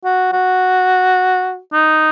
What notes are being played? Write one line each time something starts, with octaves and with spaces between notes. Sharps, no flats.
F#4
F#4
D#4